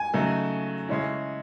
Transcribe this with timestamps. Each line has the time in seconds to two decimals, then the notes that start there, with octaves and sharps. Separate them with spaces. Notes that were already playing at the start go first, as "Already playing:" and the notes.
Already playing: G#5
0.14 C#3 F#3 A3 D#4
0.89 C#3 G#3 C#4 E4